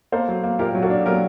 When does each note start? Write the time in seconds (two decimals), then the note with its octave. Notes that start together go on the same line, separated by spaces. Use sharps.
0.12 A#3 A4 C5
0.28 F#3
0.44 A#3
0.59 A#2 G4 A#4
0.75 F#3
0.82 F#4 A4
0.90 D4
1.06 F#3 G4 A#4